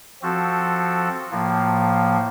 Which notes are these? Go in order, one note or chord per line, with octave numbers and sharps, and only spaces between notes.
F3 C4 F#4 A4
A2 F3 A#3